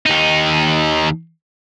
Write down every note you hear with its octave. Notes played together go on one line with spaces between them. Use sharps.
D#2 D#4